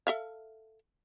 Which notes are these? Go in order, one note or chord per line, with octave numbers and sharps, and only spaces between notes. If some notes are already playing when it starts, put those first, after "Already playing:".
A4 E5 F5